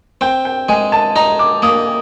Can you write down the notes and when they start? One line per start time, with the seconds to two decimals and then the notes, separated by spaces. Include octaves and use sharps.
0.21 C4 G5
0.45 G5
0.69 G#3 G#5
0.92 A5
1.16 D#4 A#5
1.39 D6
1.62 A#3 D#6